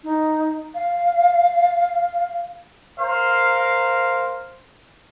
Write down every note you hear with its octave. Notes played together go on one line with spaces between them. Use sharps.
D#4
F5
A#4 C5 F5